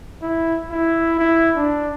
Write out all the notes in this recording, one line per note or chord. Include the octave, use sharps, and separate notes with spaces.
E4
E4
E4
D4